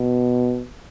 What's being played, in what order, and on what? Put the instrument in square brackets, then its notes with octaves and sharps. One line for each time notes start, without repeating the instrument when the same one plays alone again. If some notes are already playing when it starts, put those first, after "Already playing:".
Already playing: [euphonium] B2